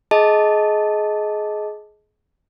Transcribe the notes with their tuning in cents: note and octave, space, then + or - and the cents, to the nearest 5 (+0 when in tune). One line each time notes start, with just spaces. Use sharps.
G#4 +25 D#5 +15 A5 +0